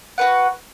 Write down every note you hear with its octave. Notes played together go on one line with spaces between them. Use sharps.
F#4 B4 F#5